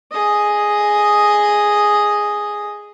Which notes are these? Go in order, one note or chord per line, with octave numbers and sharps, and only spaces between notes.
G#4 D#5